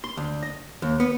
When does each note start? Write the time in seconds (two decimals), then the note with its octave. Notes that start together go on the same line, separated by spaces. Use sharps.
0.04 C6
0.17 D2
0.43 D#5
0.82 D#2
1.00 B3